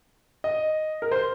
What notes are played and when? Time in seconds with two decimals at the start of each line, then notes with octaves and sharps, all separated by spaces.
0.44 D#5
1.02 A#4
1.11 C5